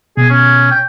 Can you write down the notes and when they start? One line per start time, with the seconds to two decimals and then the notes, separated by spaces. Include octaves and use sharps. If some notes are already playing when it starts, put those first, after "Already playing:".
0.17 B2 G#4
0.30 C#4
0.71 G5